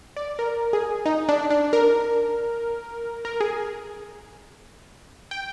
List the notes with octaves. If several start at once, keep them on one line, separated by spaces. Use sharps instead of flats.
D5
A#4
G#4
D#4
D4
D4
A#4
A#4
G#4
G5